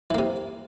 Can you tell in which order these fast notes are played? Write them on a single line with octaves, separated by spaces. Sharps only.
E3 A#3 C3